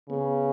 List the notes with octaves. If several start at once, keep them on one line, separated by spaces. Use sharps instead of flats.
C#3 B3